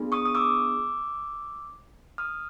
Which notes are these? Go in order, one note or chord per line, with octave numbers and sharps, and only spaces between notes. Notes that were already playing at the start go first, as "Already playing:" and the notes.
Already playing: B3 D4 F4 G#4
C#6 D#6
D#6
D6 E6
D#6 F6